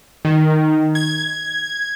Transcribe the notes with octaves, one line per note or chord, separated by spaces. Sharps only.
D#3
G#6